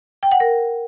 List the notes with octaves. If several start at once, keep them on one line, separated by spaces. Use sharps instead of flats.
G5
F#5
A#4